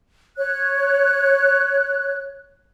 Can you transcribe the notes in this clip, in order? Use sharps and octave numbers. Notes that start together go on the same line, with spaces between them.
C#5 F#6